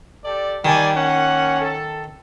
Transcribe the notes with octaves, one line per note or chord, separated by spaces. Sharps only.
G4 A4 D5
D#3 G3 D5 G#5
A#3 C#4 F#5
A4